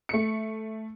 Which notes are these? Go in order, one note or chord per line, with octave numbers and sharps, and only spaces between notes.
A3 C#7